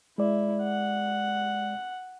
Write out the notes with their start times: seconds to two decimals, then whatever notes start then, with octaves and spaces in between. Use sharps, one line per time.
0.18 G#3 E4 D5
0.63 F#5